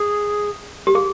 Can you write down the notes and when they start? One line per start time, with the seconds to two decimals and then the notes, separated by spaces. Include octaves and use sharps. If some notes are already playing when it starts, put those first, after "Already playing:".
Already playing: G#4
0.87 G4
0.95 G#4